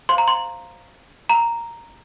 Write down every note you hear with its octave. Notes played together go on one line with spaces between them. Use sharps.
C5 F5 C6
A#5
C6
A#5